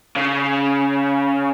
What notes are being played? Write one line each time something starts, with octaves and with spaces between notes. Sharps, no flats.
C#3